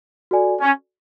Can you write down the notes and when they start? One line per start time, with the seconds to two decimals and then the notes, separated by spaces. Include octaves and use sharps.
0.31 F#4 A4 D5 G#5
0.61 C#4